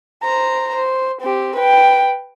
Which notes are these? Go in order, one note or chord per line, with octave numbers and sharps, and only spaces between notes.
C5 A#5
C5
C4 G4
B4 G5